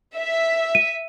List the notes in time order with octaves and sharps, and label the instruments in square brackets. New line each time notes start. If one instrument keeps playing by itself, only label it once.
[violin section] E5
[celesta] D#7